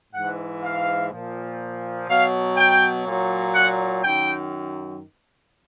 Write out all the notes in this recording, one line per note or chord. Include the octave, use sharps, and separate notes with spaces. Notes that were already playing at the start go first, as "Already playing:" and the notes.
G#2 E3 F#5
F5
A#2 F3
B2 F#3 F5
G5
A#2 F#3
F#5
F#2 D#3 G5